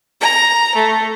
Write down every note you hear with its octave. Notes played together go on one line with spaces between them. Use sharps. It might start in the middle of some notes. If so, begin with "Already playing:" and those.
A#5
A3